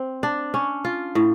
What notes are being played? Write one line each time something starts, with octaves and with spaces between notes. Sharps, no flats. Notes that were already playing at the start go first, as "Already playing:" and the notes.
Already playing: C4
D4
C#4
F4
A2